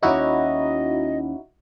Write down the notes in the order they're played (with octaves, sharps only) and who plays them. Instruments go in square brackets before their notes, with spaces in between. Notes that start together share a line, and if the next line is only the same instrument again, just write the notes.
[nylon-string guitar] D#2 C#4 D5 [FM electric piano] D#4 E4 F#4 [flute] D#5